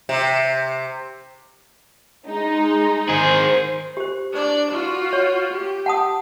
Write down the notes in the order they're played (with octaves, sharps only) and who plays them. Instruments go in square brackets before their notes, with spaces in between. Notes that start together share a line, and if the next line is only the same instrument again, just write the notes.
[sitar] C3
[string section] G#3 D#4
[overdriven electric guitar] D#3 G#4 [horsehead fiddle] C5
[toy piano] G4 C5
[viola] D4 D5
F4 F#4
[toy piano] C#5
[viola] G4
[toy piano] F#5 A5 D#6